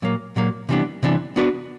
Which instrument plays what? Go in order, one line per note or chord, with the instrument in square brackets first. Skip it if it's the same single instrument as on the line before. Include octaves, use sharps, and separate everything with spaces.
[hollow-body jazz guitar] A#2 F#3 A#3
A#2 F#3 A#3
C3 E3 G3 B3 D4
C3 E3 G3 B3 D4
B3 D4 F#4 B4 D5